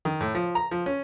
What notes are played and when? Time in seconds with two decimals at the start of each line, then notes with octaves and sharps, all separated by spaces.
0.05 D#3
0.21 A2
0.35 F3
0.55 A#5
0.71 F3
0.86 C#4